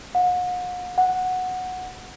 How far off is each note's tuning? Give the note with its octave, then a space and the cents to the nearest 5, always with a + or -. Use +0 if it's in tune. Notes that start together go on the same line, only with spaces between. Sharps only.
F#5 -40
F#5 -5